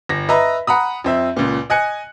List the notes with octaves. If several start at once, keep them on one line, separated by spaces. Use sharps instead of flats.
G1 A#6
B4 D#5 E5 A#5
F#5 A#5 B5 D#6
F2 C4 E5
C#2 A#2
D#5 G#5 F#6 C#7